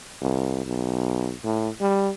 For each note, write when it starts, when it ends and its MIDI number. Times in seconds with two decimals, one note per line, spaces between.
0.22 0.64 36
0.66 1.33 35
1.44 1.69 45
1.81 2.10 55